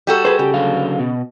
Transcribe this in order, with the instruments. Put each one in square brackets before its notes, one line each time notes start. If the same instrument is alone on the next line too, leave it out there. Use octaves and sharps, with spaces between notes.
[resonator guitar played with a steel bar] G3 F#4 A4
[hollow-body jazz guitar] G#4 C5 [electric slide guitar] B4
[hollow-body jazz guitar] C#3 [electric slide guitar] G4
[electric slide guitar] D3 F#3 F5
B2